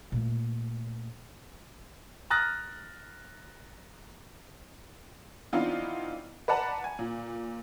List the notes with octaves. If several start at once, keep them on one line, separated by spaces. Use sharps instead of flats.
A#2 A3
A#5 D#6 F6 F#6 A6 A#6
E3 B3 C4 D4 D#4 F4
B4 D5 F#5 A5 A#5
G#5
A#2